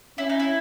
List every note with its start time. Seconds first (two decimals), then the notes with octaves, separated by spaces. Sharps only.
0.18 C#4 E4
0.29 D#4
0.40 E4